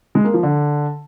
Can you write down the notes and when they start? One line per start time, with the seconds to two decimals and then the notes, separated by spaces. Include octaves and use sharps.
0.15 G#3
0.24 A#3
0.34 F3
0.43 D3